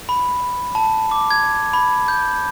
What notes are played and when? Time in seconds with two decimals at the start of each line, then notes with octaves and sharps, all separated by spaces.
0.09 B5
0.75 A5
1.11 D6
1.31 G#6
1.73 B5
2.08 G6